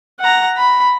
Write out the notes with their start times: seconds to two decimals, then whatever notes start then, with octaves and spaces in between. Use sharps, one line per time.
0.20 F#5 A#5
0.57 B5